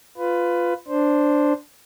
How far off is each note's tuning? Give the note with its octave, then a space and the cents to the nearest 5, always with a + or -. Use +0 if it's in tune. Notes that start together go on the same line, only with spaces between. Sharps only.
F4 +0 B4 +15
D4 +0 C5 +0